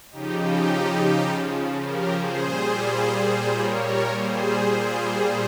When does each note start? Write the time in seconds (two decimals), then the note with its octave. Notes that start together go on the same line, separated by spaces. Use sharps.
0.11 C#3 F3 D#4 G4
0.39 D#4 G4
1.82 G4 A#4
2.11 G#4 C5
2.39 A#2 G3
3.54 A#4 C#5
4.11 G#4 C5
4.69 A#2 G3